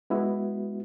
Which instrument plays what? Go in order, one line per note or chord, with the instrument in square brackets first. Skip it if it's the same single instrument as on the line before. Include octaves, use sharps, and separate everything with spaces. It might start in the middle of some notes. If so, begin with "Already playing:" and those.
[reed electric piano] G#3 B3 E4 F#4